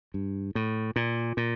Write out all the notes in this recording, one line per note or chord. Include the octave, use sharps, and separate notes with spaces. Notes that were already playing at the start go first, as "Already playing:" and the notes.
G2
A2
A#2
A#2